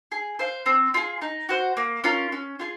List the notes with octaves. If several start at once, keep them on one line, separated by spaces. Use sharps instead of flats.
G#4
C5 F5
C4
F4 G#4
D#4
F#4 C5 F#5
A#3
C#4 F4 A#4
C#4
F4 G#4